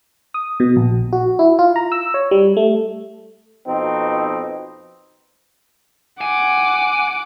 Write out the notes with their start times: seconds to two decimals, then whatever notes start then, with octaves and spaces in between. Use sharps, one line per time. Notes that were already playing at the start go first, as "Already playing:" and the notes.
0.34 D#6
0.60 B2
0.76 A#1
1.13 F#4
1.39 E4
1.59 F4
1.76 A#5
1.92 E6
2.14 C#5
2.31 G3
2.57 A3
3.68 F2 B2 C4 D#4
6.21 F#5 G#5 D6